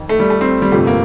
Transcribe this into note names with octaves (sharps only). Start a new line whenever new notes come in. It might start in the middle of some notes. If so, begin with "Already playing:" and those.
Already playing: F2 D#3
A3
G3
A3
C4
G3
G1 F2 C3 A3
A#3